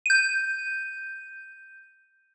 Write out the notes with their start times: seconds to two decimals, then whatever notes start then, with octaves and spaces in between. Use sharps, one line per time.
0.06 G6 D#7